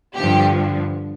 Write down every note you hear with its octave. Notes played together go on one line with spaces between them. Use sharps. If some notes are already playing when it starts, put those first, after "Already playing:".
G2 D3 F3 G4